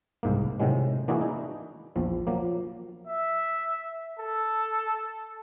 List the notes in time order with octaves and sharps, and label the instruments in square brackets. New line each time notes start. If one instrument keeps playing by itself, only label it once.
[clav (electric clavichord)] C2 G#2 A#3
A2 C3 D#3 F#3 G#3
E3 A#3 D4 E4 F#4 G#4
D#4
A#1 E2 F3
F3 F#3 A#3
[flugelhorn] E5
A4